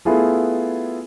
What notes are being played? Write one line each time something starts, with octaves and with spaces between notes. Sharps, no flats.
A3 B3 E4 F4 G#4 A4